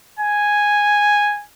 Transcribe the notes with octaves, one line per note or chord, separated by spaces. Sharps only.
G#5